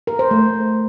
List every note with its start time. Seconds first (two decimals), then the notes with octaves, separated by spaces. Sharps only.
0.07 A#4
0.19 C5
0.31 A3